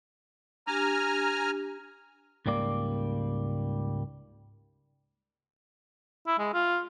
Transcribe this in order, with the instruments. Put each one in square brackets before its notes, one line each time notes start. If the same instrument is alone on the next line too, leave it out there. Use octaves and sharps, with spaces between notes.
[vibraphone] D4 G4 [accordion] G#5 A#5 F6
[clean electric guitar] C#2 G#2 G3 A#3 D5
[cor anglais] E4
G#3
F4